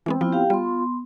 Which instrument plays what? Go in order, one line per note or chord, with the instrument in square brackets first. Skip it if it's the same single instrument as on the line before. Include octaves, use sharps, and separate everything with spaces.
[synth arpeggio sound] E3 G#3 B3 [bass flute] C4
[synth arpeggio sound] F3 [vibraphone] B3 E4 F4
[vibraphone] G4 F5 G5
[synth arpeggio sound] G3 [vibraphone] B3 C6 [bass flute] F4